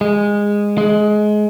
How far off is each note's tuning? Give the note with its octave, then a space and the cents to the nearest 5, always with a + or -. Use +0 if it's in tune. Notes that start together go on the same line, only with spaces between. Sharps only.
G#3 -15
G#3 +20